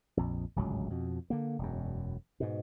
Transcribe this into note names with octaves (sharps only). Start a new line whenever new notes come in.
A#1 F2
D1 G#1 C#2 F#3
F2 B2
D3 A#3
E1 F#2
G#2 B2